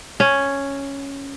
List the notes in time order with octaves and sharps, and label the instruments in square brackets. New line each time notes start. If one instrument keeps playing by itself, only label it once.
[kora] C#4